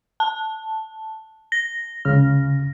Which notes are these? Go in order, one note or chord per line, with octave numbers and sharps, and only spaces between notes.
A5
A#6
C#2 C#3 F6